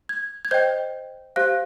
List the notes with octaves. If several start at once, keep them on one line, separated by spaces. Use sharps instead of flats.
G#6
G#6
C5 D#5 G5 G6
G4 C5 F5 F#6